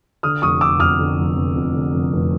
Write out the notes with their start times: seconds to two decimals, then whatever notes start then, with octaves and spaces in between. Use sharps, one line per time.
0.23 D3 D#6 F6
0.42 F1 C#6 D#6
0.61 F1 D6 E6
0.80 F2 D#6 F6
0.99 D3
1.18 F1
1.36 F1
1.56 F2
1.75 D3
1.94 F1
2.13 F1